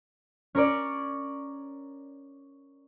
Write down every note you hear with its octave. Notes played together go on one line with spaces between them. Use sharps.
C#4 A#4 C#5 D5